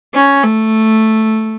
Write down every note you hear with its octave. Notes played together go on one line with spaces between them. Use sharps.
C#4
A3